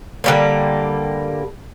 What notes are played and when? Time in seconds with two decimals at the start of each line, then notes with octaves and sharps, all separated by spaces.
0.24 D3 G3 A#3